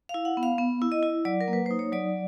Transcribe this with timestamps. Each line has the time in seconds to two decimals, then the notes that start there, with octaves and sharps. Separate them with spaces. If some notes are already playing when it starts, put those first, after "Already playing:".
0.09 F5
0.14 E4
0.25 F#5
0.37 B3
0.43 F5
0.58 B3
0.82 E4
0.92 D#5
1.03 E4
1.25 F#3 D5
1.41 A#4
1.48 A#3
1.53 B4
1.66 D#4 C5
1.79 C#5
1.92 F#3 D5